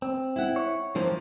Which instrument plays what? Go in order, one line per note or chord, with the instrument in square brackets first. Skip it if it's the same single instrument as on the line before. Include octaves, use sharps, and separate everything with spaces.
[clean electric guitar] C4
[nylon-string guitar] E4 F#5
[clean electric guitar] C#5
[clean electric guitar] G2 E3 [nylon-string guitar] F3 A#3 C5